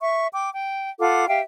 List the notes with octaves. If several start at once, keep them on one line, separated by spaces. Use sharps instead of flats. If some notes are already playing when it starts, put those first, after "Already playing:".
E5 C#6
G5 D6
G5
F4 A4 F#5 D6
G4 E5 F5 G5